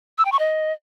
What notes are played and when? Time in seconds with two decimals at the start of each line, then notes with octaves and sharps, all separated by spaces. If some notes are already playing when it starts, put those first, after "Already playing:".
0.18 E6
0.25 G5
0.32 C#6
0.39 D#5